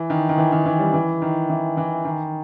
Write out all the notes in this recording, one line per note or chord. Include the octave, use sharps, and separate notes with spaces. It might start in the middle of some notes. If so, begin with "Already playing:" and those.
Already playing: E3
D#3
D#3
E3
D#3
E3
G3
E3
D#3
E3
E3
D#3